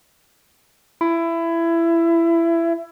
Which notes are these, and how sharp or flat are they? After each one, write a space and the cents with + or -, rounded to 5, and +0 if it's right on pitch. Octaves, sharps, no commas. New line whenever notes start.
E4 +20